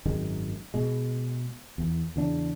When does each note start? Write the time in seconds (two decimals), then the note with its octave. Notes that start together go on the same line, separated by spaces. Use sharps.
0.05 G#1 F#2 D#3 G#3
0.74 B2 G#3
1.78 E2
2.16 E2 C#3 D4